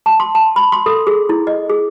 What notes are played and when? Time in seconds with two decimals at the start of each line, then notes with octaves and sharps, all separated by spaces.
0.06 A5
0.20 C6
0.35 A5
0.56 B5
0.72 C6
0.86 A4
1.07 G#4
1.29 E4
1.47 D#5
1.69 G#4